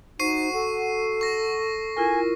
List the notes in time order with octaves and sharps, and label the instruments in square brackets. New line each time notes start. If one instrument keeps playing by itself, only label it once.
[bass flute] D#4 [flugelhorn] F#4 [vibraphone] C5 [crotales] C#6 C7 D#7
[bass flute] A4 [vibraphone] F#5
[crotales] C#6 A#6
[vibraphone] E4 F4 A#4 [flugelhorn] G#5